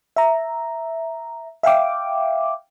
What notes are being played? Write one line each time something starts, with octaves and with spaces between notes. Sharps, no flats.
E5 A#5
E5 F5 G5 D6